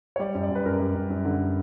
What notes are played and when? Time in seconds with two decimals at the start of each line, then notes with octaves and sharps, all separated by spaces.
0.16 C#5
0.20 G3 D5
0.35 F#2
0.43 D5
0.50 F#2 B4
0.66 F#2 A#4
0.80 G3
0.95 F#2
1.10 F#2
1.25 D3